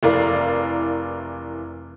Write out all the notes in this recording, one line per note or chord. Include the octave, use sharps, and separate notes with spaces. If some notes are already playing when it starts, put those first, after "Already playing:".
F1 E3 A#4 D5 F5